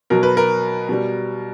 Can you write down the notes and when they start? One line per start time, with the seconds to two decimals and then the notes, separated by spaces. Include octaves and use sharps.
0.10 B2 F#3 A#4
0.23 B4
0.37 A#4
0.89 B2 G3